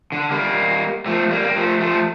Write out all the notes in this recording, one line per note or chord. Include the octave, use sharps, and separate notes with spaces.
D3
G3 A#3
F3 A3
G3 A#3
A#3
F3 A3
F3 A3